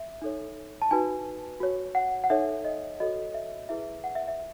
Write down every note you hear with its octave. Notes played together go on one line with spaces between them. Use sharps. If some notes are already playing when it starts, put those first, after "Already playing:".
Already playing: E5
D#4 A4 C#5
A5
D#4 F#4 B4 G#5
F#4 C#5
F#5
F#5
D#4 A4 C#5 E5
D#5
F#4 A4 C#5 D#5
E5
E4 G#4 B4 E5
F#5
E5
E5